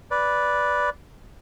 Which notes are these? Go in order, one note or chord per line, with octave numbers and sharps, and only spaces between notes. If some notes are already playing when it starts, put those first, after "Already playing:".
B4 D5